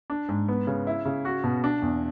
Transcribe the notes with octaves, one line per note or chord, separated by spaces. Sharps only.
D4
G#2
B3
C#3
E4
C#3
F#4
B2
D4
E2